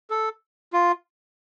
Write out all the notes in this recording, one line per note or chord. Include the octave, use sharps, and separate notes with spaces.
A4
F4